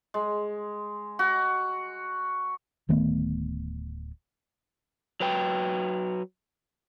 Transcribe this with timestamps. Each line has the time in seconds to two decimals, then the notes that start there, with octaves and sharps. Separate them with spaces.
0.14 G#3
1.19 F#4
2.89 D1 D#3 A3 B3
5.20 F#3 B4 G5